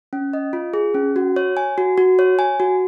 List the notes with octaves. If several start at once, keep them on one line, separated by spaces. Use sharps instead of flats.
C#4
D#5
F4
G#4
C#4
F#4
C#5
G#5
F#4
F#4
C#5
G#5
F#4